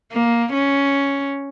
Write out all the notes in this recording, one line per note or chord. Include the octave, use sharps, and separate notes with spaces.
A#3
C#4